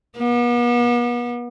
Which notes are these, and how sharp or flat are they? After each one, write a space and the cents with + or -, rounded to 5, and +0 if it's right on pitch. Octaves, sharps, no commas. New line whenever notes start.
B3 -40